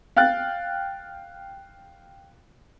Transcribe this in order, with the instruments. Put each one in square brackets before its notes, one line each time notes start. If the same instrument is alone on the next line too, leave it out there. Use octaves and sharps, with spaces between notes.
[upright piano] F5 G5 F#6 A6